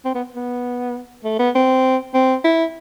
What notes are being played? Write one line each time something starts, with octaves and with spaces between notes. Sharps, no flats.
C4
B3
B3
A3
B3
C4
C4
E4